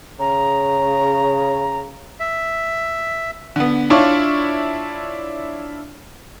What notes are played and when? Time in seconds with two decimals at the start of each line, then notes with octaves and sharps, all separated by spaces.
0.20 C#3 A#5
2.20 E5
3.56 D3 B3
3.90 D4 E4 F4 C#5 D5 C#6